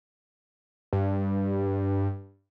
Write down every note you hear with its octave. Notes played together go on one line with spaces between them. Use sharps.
G2